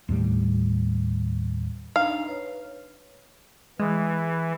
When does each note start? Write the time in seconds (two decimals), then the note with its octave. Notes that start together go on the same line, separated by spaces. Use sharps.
0.09 D#2 A2 G3
1.96 D4 D#4 F5 A#5
2.28 B4 C#5
3.80 E3 G#3